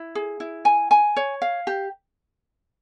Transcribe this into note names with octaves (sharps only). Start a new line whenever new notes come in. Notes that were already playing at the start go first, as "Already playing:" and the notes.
Already playing: E4
G#4
E4
G#5
G#5
C#5
F5
G4